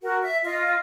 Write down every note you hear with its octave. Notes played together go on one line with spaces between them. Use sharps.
F#4 A#4
E5
F4 D#5